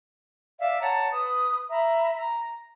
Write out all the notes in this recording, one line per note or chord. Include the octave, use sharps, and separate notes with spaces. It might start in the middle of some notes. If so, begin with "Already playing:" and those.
D5 E5 F5
C#5 F#5 A5 A#5
B4 D#6
E5 A#5 B5
A#5